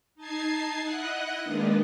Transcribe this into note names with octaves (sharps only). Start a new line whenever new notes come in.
D#4 A5 G#6 C7
E4 D#5 F#5 F#6
D#3 G#3 A#3 B3 D4 D#4